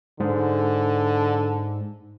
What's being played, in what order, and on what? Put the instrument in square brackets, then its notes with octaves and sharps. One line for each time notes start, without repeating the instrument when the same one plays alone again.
[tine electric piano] G#2 [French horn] D3